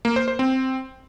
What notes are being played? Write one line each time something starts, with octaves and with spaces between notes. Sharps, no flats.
A#3
C5
C5
C4